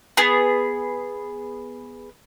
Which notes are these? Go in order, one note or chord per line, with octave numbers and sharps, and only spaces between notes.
B3 G#4